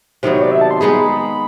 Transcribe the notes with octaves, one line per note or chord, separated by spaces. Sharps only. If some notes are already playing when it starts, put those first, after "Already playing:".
C3 D#3 F#3 B3 C5
C#5
D5
E5
A5
C6
G#3 B3 D#4 G#4 B5